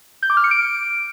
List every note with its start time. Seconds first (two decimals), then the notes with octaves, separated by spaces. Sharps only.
0.23 G6
0.30 D6
0.37 F6
0.44 C#7
0.51 D7